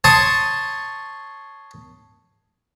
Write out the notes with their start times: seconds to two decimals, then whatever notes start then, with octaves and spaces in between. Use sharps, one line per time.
0.04 C#5 A5 C6 C#6 D#6